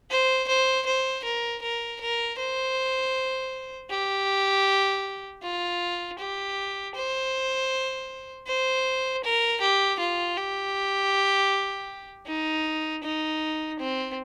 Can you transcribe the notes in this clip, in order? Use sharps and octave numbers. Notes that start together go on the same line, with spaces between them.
C5
C5
C5
A#4
A#4
A#4
C5
G4
F4
G4
C5
C5
A#4
G4
F4
G4
D#4
D#4
C4